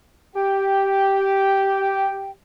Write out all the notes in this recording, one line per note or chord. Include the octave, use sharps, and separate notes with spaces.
G4 G5